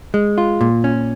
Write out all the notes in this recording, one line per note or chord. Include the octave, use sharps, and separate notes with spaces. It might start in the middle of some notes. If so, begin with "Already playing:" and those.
G#3
F4
A#2
C#4